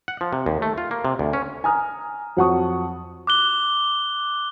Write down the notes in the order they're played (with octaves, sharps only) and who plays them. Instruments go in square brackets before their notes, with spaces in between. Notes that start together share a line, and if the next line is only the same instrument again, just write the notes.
[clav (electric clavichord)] F#5
F3
C3
D#2
A3
F4
A#3
C3
D2
C#4
[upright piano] G#5 A#5 D#6 F6
F2 F#3 F#5 A5 C#6 D#6
[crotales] D6 F#6 G7